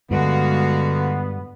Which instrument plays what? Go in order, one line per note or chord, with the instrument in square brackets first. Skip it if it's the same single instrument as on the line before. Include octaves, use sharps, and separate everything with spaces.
[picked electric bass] G2 [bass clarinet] D3 [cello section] G#3 F#4 F5 [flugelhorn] B3